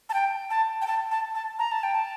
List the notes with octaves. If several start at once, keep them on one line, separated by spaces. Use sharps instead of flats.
A5
G5
A5
G5
A5
A5
A5
A#5
A5
G5
A5